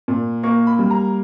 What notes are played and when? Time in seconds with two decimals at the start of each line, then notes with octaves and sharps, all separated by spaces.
0.08 A#2
0.43 A#3 C#6
0.67 B5
0.79 G3
0.91 A#5